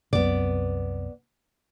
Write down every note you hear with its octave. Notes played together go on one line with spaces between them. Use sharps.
C2 F#2 C3 B3 D5